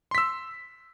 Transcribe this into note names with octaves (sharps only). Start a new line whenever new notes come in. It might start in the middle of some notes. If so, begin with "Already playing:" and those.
C6 E6 B6